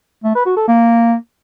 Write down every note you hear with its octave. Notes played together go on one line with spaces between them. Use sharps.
A3
B4
F#4
A4
A#3